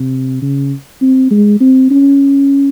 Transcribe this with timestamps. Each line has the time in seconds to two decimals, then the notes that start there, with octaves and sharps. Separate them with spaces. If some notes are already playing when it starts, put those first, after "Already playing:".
Already playing: C3
0.42 C#3
1.01 C4
1.31 G#3
1.60 C4
1.90 C#4